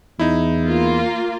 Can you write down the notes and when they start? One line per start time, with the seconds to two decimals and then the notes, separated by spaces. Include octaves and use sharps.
0.19 E2 D#4 E4
0.64 A#3 F4